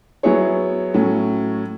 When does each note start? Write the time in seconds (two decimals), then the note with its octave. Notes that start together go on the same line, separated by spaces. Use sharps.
0.23 F#3 B3 E4 G#4 C#5
0.94 A2 F#3 C#4